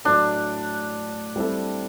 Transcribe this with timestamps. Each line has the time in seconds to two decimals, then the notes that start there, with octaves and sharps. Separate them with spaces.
0.05 A2 F#3 A3 D4
1.36 G3 C4 E4 A4